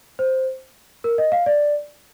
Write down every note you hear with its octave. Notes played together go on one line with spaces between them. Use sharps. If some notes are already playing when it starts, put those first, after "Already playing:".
C5
A#4
D#5
F5
D5